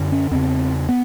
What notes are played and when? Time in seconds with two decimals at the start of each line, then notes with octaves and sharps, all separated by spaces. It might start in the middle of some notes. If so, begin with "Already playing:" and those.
Already playing: F#2 D3
0.12 C#4
0.31 E2 C#3 C4
0.89 B3